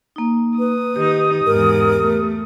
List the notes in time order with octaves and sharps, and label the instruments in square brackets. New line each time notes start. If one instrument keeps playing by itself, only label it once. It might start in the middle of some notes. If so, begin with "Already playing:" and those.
[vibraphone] A#3 D#4
[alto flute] B4 [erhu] D#6
[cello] D#3 D#4 [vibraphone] G4
[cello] E2 G#2 [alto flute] A#4
[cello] A3